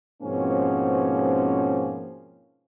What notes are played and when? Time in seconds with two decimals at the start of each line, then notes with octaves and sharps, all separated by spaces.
0.22 G#2 B2 F3 A#3 C4 C#4